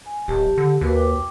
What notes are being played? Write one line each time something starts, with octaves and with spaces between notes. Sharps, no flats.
G#5
D1 G4 A5
D3
D#2 F#4 A#4 B4
G5 D6